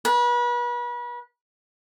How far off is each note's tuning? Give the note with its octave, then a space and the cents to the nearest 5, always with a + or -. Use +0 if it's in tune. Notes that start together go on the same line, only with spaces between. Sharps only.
B4 -35